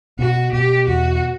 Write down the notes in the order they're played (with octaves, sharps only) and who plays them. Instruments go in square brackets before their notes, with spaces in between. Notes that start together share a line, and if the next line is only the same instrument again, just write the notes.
[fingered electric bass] B2 [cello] F#4
[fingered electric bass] B2 [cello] G4
[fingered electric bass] E2 [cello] F#4